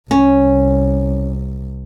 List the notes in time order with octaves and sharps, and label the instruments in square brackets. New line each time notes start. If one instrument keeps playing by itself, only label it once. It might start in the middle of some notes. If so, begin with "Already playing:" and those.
[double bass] C2 [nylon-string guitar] C#4